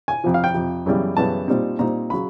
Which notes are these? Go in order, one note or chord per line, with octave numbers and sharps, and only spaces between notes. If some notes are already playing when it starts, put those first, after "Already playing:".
G#5
F2 C3 F3
F5
G5
F2 C3 F3
F#2 C#3 E3 G3 B3
F#2 C#3 E3 G3 B3 A5
A#2 G3 C4 D#4
A#2 G3 C4 D#4 A#5
C#3 F#3 B5